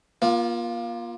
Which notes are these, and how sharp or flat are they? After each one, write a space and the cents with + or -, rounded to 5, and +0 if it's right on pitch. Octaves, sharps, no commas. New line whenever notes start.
A#3 +40 F4 +0